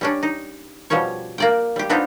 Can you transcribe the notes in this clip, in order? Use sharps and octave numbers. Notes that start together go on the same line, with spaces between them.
G3 C#4 D4
D#4
B2 F3 G3 C#4 C#5
A#3 D5 G5
G3 G4
B3 C4 D4 D#4 F4 G4